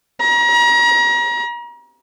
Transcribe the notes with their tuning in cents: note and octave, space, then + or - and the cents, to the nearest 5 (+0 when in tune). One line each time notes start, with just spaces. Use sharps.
A#5 +35